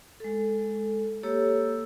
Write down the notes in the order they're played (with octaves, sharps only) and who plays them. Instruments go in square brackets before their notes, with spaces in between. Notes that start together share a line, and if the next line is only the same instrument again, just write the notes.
[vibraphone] G#3 A4
A#3 G4 A4 C#5 E6